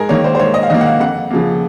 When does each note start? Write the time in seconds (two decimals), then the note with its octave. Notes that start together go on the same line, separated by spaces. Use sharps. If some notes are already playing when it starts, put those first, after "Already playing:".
Already playing: G#2 G#4 A#4 G#5
0.09 D#3 A#3 C#5
0.24 C5
0.35 C5
0.39 G#2 C#5
0.54 D#5
0.63 F5
0.70 D#3 A#3 D#5
0.81 F#5
0.86 F5
1.00 F2 F#5
1.31 C#3 F3 A#3